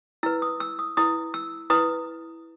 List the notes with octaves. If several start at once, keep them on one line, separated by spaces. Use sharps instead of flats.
E4 B4 E6
D#6
E6
D#6
E4 B4 D#6
E6
E4 B4 D#6